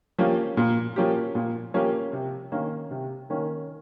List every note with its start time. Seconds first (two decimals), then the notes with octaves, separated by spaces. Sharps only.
0.18 F3 A#3 C#4 G4
0.57 A#2
0.96 F3 A#3 C#4 G4
1.35 A#2
1.74 F3 A#3 C#4 G4
2.13 C3
2.52 D#3 A#3 C#4
2.91 C3
3.30 D#3 A#3 C#4